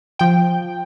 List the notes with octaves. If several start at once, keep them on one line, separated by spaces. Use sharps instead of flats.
F3 G5